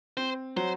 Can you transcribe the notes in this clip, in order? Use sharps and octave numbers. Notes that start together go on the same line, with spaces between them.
C4 C5
F#3 C5